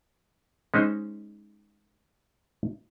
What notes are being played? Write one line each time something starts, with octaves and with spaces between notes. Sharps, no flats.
G#3 C#4 D#4 C5